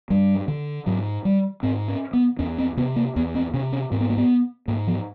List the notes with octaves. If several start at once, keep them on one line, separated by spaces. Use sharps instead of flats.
G2 G3
D3
G#2 F#3
G3
G#2 C4
C#4
B3
E2 C#4
C4
C3 B3
A#3
E2 B3
C4
C3 C#4
C#4
G#2 C4
B3
A#3
B3
G#2 A#3
F3